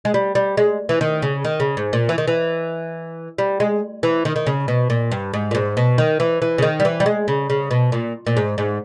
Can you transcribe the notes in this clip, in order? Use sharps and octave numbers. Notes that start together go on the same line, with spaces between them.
G#3
G3
G3
G#3
E3
D#3
C#3
D#3
C#3
G#2
A#2
E3
D#3
E3
G3
G#3
E3
D#3
D#3
C#3
B2
A#2
G2
G#2
A#2
G#2
B2
D#3
E3
E3
C#3
D#3
G3
E3
G3
G#3
C#3
C#3
B2
A#2
A#2
G#2
G#2